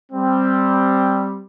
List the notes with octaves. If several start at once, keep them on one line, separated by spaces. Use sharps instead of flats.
G3 C4